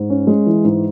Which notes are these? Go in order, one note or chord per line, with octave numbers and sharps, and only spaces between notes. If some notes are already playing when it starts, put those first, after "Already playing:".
Already playing: G#2
C#4
G#3
E3
G#2